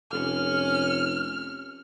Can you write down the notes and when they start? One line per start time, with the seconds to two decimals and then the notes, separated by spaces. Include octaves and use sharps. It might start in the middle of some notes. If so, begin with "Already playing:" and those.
0.12 F1 C#4 F6